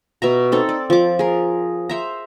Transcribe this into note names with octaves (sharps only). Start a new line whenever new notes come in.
B2 E5 A#5
C4 D#4 A4
D5
F3 D6
G#4 A#4
C5 E5 A#5